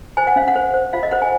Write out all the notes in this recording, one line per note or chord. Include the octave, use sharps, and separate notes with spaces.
C5 G#5
F#5
C#4 F5
F#5
C5
C5
F4 F5
D#5
C5 F#5
G#5